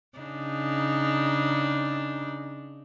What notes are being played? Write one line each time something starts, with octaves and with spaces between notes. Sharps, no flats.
C#3 D4 D#4